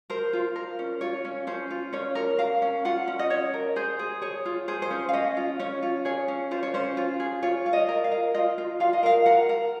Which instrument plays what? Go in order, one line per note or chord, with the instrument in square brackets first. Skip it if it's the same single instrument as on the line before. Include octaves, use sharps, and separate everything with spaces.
[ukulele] A#4 C5
F4
A#4
C#4
F4 C#5
C#4
C#4 C5
F4
C#4 C#5
A#4
A#4 F5
C#4
F4 F#5
C#4
D#5
C#4 C#5
A#4
G#4 C5
G#4
G#4 C#5
F4
G#4 C5
C5
C#4
F5
C#4 D#5
F4
C#4 C#5
F4
G#4 C#5
C#4
F4 C5
C#5
C#4 C5
F4
G#4
F4 C#5
F4
D#5
A#4
F5
A#4
F4 D#5
F4
F4 F5
D#5
A#4 F5
A#4 F#5
A#4